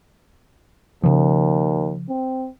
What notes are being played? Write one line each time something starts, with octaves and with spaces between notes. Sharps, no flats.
D#2 C#3 F3
C4